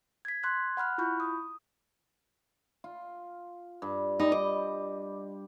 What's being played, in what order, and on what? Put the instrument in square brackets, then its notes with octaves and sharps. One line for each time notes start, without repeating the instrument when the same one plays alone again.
[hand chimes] G#6 B6
C6 F#6 G#6
F#5 B5 F6 F#6
E4 F4 B5 C#6 G6
D#6
[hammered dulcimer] F4
G2
[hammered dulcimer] G3 [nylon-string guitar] D#4
[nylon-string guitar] D#5 [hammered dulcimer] D6